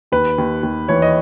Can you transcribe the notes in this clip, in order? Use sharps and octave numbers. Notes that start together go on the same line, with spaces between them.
D#2 B4
D#2
D#2
E3 C#5
D#5